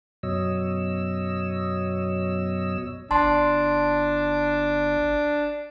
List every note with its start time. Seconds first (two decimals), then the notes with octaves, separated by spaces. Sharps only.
0.23 F#2 B2 F#3 C#5 D#5 E6
3.11 G1 D4 A5 C6